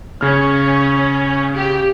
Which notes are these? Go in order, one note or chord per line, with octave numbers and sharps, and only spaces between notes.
C#3 C#4 F6
G4